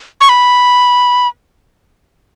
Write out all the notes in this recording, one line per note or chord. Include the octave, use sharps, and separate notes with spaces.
C#6
B5